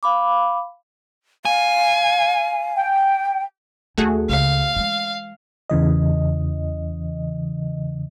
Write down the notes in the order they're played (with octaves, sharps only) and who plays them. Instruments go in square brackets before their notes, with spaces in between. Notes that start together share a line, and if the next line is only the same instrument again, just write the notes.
[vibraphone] F5 B5 D6
[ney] F5 [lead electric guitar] G#5
[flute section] G5
[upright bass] D#2 [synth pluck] A3 F#4 G#4
[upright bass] C#2 [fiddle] F5
[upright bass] E3 G#3
[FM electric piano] E2 C#3 E3 D#5